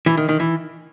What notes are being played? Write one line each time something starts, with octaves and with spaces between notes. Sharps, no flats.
E3
D#3
D#3
E3